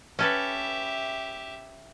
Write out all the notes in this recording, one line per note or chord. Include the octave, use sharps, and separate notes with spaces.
C#4 G4 A4 B4 E5